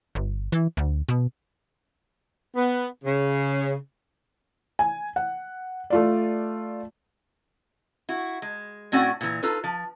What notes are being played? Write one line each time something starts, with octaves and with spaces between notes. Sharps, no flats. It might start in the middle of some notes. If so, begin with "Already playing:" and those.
G1
E3
D2
B2
B3
C#3
G#5
F#5
A3 F4 D5
E4 F#4
G#3
A2 C4 C#4 F#4 D5 F#5
A#2 E3
D#4 F4 A4 B4
F3